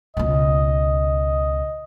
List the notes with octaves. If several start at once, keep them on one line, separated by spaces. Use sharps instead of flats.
C#2 B2 D#5